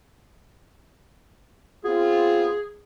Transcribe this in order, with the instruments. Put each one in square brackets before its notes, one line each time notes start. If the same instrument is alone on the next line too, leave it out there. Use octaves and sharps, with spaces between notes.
[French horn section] B3 C4 F4 [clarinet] G#4